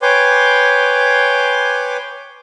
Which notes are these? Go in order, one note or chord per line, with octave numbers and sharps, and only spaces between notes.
B4 C#5 G5 G#5 C6 D6